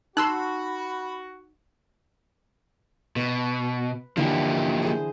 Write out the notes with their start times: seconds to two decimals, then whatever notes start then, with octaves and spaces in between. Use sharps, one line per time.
0.17 D#4 F#4 B5 C6 E6 F#6
3.16 B2 B4
4.17 D3 E3 F3 A#3 G4 E5
4.83 G#4 C5